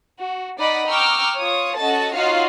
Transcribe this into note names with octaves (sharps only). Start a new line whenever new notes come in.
F#4
D#4 D5 D#5 F#5 B5
G5 A#5 C#6 D6 E6 F6
F4 C#5 D#6
C#4 F#4 A4 D#5 A5 A6
D#4 F4 F#4 C#5 D#5 F5